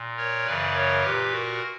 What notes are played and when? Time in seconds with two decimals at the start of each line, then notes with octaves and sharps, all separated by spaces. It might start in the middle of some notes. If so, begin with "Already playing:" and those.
Already playing: A#2
0.17 A#4 C#5
0.46 F#2 C#3 E3 B4 D5
0.74 A#4 C#5
1.03 A#2 G4 B4
1.32 F#4 A#4